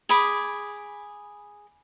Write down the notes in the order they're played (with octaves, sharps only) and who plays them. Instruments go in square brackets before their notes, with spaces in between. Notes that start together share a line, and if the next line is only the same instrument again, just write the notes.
[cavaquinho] G#4 B5 D6